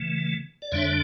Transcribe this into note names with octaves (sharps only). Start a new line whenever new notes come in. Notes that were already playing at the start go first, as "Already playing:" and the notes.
Already playing: C#3 E3 A3
D5
F2 D3 G3 D4 C#5 E5